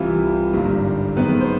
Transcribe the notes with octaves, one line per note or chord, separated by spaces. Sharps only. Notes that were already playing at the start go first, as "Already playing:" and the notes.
Already playing: C2 C3 E3 G3 F4
G#1 G2 D3 G3 A#3
F#2 D#3 G#3 B3 C4 B4
C5